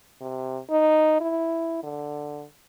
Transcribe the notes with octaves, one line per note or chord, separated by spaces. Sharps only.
C3
D#4
E4
D3